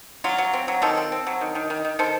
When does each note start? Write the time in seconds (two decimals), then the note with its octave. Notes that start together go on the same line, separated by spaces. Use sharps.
0.24 F#3 F4
0.38 F#3
0.53 C4
0.68 F#3
0.82 D#3 F4 A4
0.97 C4
1.12 C4
1.27 F#3
1.41 D#3
1.55 D#3
1.70 D#3
1.85 D#3
1.99 D#3 A4 C5